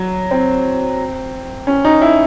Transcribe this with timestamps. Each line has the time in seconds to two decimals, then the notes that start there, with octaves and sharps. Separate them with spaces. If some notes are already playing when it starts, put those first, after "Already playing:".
Already playing: F#3
0.31 C4
1.67 C#4
1.85 D#4
2.02 E4